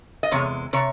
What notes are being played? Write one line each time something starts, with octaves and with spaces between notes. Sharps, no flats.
D#5
E2 C3 G#3 C#5
C3 C#5